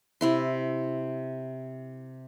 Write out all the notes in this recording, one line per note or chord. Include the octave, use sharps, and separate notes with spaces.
C3 E4 C6